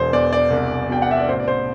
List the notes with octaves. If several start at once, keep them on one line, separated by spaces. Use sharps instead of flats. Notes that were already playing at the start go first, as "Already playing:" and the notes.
Already playing: E1 E3 C5
E2 D5
D5
C2
B2 G5
F#5
E5
D5
A1 C5
D5
C5